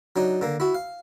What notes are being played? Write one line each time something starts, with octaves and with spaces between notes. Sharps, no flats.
F#3 D4 D#4
D3 A#3
E4 F#4
F5